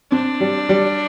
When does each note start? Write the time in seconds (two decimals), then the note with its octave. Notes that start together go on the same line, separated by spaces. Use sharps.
0.12 C4 D4
0.40 G3
0.69 G3